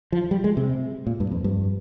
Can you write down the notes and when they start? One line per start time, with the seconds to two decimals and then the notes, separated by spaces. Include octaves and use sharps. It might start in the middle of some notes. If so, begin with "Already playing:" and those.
0.12 F3
0.31 G3
0.44 G#3
0.57 C3
1.07 A#2
1.20 G2
1.32 F2
1.44 G2